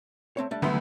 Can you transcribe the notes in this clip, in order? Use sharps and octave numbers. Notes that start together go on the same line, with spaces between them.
A3 C4 C#5
G3 A3 D4
C2 D3 F#3 A3 B3 E5 F#5 C6